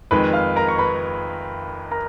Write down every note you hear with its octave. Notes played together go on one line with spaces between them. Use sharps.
F2 D#3 G#3 B4 B5
F5 F6
A#4 A#5
C#6
B4 B5
A#4 A#5